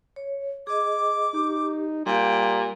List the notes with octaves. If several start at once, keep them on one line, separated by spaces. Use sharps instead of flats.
C#5
G#4 D#5 D6
D#4 G4
A#2 G3 F5 G5